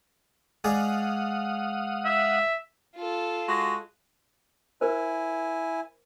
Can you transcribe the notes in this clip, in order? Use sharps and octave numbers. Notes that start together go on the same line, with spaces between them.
G#2 G#4 D5 F5 F#5 D#6
E5
F4 A4
G#3 F#4
E4 A#4 C5 G#5